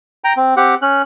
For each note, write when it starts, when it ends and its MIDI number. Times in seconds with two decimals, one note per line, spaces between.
0.24 0.33 79
0.24 0.33 82
0.37 0.54 60
0.57 0.75 60
0.57 0.75 67
0.57 0.75 78
0.82 1.02 61
0.82 1.02 90